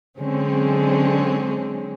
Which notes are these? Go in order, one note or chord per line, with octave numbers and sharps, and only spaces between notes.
D3 F#3 G#3 C4 C#4